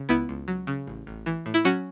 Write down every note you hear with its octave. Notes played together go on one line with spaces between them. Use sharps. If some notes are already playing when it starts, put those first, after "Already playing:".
Already playing: C#3
C#2 B3 E4
C#2
F#3
C#3
A1
A1
E3
A2
E4
F#3 C#4 F#4